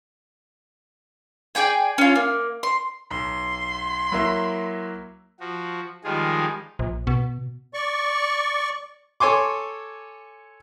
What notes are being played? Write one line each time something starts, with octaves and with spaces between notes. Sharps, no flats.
G#4 D5 G5 G#5
C#4 F4
A#3
C6
B1 C6
F#3 A#3 E4
F3 F#4
D#3 F3 G3 G#3 F4 G#4
A#1
B2
D5 C#6
A4 C#5 G#5 C6 D6